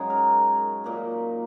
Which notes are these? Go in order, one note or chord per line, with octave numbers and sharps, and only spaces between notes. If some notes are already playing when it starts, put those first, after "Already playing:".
Already playing: F#2 C#3 G#3 D#4 F#4 G#4
A#4
A#2 A#3 D#4